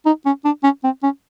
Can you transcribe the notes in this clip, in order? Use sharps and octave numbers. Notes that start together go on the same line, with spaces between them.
D#4
C#4
D4
C#4
C4
C#4